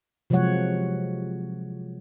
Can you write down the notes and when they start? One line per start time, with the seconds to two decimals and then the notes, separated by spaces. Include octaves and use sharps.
0.30 C3 F3 F#3 G#3 C#5 F#5